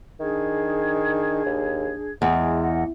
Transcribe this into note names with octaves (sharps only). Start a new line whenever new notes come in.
D#3 D4 G#4 G#6
D#2
E2 G#3
D#5 F#5